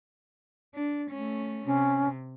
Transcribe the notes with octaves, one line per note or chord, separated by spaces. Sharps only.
D4
A3 C#4
C3 C#4